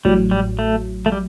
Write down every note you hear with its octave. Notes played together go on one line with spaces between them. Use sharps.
A1 A2 F#3 G3
G3
A3
A3
G3